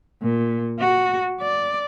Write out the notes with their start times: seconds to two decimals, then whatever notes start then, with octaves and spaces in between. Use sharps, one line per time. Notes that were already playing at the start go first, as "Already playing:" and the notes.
0.23 A#2
0.80 F#4
1.41 D5